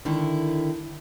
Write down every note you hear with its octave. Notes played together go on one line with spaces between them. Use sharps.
D3 D#3 E4